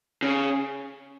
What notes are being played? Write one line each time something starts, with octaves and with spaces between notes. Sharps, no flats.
C#3